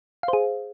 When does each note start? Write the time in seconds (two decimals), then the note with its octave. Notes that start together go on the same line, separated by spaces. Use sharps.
0.23 F5
0.28 C5
0.33 G#4